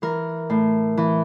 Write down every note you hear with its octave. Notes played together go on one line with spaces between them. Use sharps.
E3 A#4
A2
E3